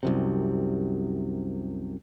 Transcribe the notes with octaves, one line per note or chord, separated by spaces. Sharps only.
C2 F#2 C3